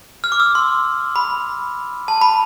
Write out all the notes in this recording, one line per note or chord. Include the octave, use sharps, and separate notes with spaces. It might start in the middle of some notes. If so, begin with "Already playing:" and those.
F6
D6
E6
C6
B5
A5
B5